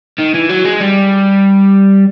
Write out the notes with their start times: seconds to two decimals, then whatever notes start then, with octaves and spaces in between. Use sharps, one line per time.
0.18 D#3
0.34 E3
0.49 F#3
0.64 G#3
0.80 G3